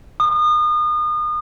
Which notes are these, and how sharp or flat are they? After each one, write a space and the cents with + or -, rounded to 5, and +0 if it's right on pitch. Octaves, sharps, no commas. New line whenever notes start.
D#6 -35